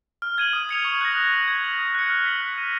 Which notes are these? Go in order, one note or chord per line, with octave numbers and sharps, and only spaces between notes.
F6
G#6 D#7 F#7
D#6
G#6 C#7 F7
C#6
F#6 A#6
D#6
F#6 B6 F#7
G#6
D#7 F#7
D#6
F#6 C#7
F6
B6 F#7
F#6
A#6 D#7